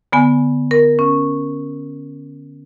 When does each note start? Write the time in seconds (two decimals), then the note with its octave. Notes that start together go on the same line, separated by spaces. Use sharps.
0.13 D3 B3 G#5
0.71 A#4
0.99 C#4